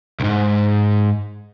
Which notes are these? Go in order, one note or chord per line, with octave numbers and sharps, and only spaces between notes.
C2 G#2